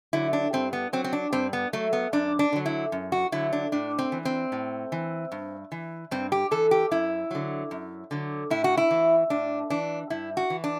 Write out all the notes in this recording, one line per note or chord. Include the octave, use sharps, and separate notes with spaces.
D3 F#3 E4
D4
G2 C4
B3
F#3 C4
C4
D4
G2 C4
B3
F#3 A3
B3
F#2 D4
D4
D3 F#3
E4
F#2
F#4
D3 F#3 E4
D4
A2 D4
C4
E3
C4
A2
E3
G2
E3
G2 C4
G4
E3 A4
G4
F#2 E4
D3 F#3
F#2
D3 F#3
A2 E4
F#4
E4
E3
A2 D4
E3 D4
G2 E4
F#4
E3
D4